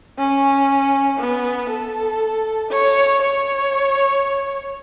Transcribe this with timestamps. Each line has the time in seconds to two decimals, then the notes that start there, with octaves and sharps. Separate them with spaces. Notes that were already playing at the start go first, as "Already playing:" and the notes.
0.18 C#4
1.20 B3
1.70 A4
2.71 C#5
3.22 C#5